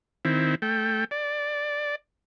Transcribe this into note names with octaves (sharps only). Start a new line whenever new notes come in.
D#3 C4 E4
A3 G5
D5